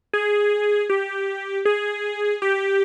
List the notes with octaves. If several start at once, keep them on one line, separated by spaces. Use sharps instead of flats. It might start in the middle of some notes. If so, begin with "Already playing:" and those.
G#4
G4
G#4
G4